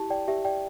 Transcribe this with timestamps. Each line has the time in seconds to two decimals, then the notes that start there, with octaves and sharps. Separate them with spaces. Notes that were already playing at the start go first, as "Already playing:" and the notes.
Already playing: E4 G4 A5
0.10 D5 G5
0.28 G4 E5
0.45 D5 G5